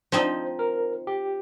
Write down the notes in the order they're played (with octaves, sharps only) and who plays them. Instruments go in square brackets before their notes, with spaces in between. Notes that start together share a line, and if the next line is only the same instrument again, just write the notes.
[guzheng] F3 C4 D#4 [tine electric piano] C5
[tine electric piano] A#4
G4